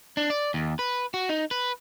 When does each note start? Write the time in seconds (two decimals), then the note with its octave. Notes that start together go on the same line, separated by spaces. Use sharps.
0.17 D4
0.30 D5
0.54 D#2
0.79 B4
1.14 F#4
1.29 D#4
1.51 B4